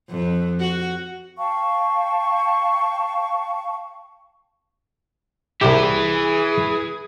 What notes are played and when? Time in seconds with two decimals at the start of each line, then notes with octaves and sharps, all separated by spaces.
0.10 F2
0.60 F#4
1.38 F5 G5 A5 C#6
5.61 C2 C3 E4 G4 G#4 B4